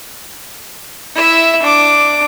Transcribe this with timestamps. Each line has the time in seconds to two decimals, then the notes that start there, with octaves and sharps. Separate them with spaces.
1.15 E4 E5
1.62 D4 D6